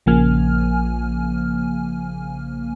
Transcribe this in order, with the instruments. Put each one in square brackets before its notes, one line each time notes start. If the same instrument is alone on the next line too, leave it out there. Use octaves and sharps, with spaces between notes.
[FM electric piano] A#1 C#3 F3 A#3 G#5 F6